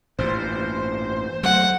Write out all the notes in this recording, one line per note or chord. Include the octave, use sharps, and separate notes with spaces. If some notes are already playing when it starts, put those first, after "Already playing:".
A1 G2 A#2 C5
F#3 A3 F#5